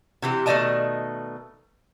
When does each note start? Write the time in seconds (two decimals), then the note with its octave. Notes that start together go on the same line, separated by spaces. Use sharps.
0.22 C3 E3 G4
0.46 B2 D#3 A3 D5 D#5 A5